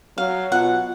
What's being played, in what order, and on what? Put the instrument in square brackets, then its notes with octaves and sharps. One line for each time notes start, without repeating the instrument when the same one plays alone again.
[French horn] F#3 [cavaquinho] F5
[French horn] B2 [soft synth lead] F4 [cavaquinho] F#5